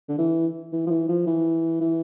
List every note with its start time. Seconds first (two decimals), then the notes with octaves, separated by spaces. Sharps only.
0.09 D3
0.19 E3
0.73 E3
0.87 F3
0.90 E3
1.09 F3
1.27 E3
1.81 E3